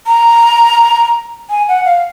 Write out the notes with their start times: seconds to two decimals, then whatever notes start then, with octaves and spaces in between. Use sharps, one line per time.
0.07 A#5
1.50 G#5
1.68 F#5
1.85 F5